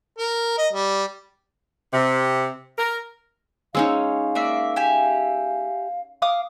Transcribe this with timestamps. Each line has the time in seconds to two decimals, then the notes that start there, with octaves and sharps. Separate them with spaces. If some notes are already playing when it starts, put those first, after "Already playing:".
0.18 A#4
0.58 D#5
0.73 G3
1.93 C3
2.77 A#4
3.75 G#3 C#4 D#4 F5 E6
4.35 A#3 D5 E5
4.76 G4 E5 G#5
6.22 F5 D6 D#6